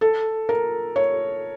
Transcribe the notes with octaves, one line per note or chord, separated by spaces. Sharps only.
A4
A#4
C#5